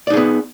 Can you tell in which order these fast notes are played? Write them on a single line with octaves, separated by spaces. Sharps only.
D5 D#4 G#4 B3